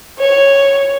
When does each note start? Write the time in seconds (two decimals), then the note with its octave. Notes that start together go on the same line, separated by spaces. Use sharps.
0.19 C#5